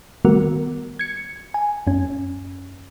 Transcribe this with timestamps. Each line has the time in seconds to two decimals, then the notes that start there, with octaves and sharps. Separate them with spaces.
0.25 D#3 G3 A3 B3 F#4 A#4
0.99 G#6 C#7
1.54 G#5
1.87 F#2 C#4